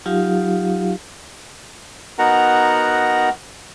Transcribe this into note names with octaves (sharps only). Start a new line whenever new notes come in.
F#3 D#4 F4 G4 F5
B3 D#4 F#4 A#4 F#5 A#5